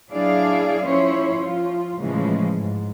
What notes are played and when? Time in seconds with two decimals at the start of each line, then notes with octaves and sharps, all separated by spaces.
0.11 F#3 D4 E4 G#4 D5 F5
0.84 F3 C#4 E4 C5 C#5
1.42 F3 F4
2.01 A2 C#3 E3 F3 G#3
2.59 G#2